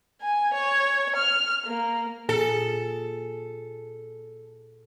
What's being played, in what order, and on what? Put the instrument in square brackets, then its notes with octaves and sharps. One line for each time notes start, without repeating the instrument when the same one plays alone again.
[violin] G#5
C#5
F6
A#3
[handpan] A#2 G#4 [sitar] A4